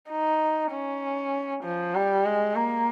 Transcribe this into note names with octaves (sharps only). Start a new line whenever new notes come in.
D#4
C#4
F3
G3
G#3
A#3